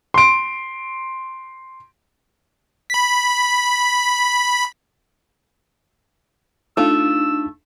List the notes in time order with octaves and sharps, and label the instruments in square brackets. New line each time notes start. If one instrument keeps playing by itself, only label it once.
[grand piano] C6 D7
[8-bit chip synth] B5 B6
[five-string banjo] A3 F4 [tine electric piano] D4 D#4 [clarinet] E6